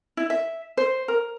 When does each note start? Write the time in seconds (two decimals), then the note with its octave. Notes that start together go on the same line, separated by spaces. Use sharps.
0.17 E4
0.30 E5
0.77 C5
1.08 A#4